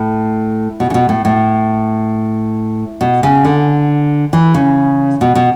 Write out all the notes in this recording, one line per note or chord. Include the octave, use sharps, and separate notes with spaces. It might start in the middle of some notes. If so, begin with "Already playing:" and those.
Already playing: A2
B2
C#3
B2
A2
A2
B2
C#3
D3
E3
C#3
B2
B2